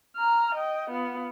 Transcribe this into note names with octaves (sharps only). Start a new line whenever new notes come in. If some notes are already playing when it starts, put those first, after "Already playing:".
A#5 F6
D#5 G5
B3 F4